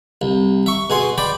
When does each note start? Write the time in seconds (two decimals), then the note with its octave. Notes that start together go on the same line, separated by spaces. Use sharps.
0.22 C2
0.66 E5 C#6
0.90 B2 G#4 C6
1.18 D5 G5 B5